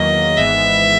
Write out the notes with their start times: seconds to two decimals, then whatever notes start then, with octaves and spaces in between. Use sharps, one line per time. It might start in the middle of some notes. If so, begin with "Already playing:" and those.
Already playing: E2 D#3 F#3 A#3 D#5
0.37 G#1 G#2 E3 G#3 B3 E5